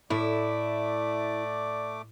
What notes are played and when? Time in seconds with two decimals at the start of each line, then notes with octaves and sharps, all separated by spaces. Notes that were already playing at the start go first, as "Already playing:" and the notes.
0.10 A2 A3 E4 D5 D6